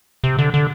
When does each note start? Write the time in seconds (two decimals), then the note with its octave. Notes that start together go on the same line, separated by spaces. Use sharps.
0.24 C3
0.38 D3
0.54 D3